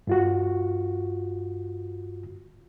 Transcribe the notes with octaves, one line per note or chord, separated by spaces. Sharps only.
G2 F4 F#4